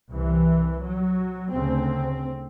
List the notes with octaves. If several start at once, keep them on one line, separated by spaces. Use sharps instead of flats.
C2 C3 E3
F#3
D2 C#3 C4